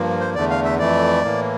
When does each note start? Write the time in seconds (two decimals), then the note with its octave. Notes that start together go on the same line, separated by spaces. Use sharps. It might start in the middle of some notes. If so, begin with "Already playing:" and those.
Already playing: G2 F3 A#3
0.20 C5
0.35 E2 D3 A3 D5
0.50 F5
0.65 E5
0.79 F2 E3 A3 D5
1.23 A2 E3 A#3